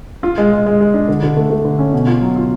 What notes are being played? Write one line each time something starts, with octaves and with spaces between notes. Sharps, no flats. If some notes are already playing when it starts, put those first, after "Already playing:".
F4
G#3
G#3
G#3
G#3
D4
D3
D3
A3
A3
D3
C#4
B2
F4
F#3
F4